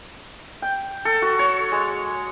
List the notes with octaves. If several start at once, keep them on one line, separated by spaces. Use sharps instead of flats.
G5
A4
F#4
C#5
G#3